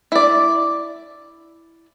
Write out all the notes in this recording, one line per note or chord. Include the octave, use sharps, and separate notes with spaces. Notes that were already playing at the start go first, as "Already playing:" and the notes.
E4 D5